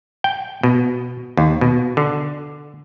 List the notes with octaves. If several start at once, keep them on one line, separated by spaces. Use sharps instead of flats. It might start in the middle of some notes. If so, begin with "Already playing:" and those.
G5
B2
D#2
B2
D3